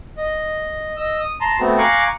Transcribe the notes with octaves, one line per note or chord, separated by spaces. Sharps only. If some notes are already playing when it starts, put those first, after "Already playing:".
D#5
D#5 E6
D#6
A5 A#5 C6
A3 B3 C4 F#4
F5 G#5 A#5 C#6 D6 F#6